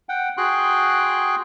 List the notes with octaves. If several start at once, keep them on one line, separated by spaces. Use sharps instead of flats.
F#5 G5
F#4 G#4 G5 C6 F#6